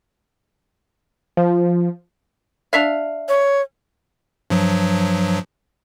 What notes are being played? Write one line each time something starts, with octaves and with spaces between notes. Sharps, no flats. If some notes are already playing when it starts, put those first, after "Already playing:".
F3
D4 E5 F5
C#5
G2 F3 F#3